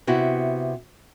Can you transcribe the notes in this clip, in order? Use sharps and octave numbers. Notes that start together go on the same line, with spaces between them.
C3 B3 E4 F#4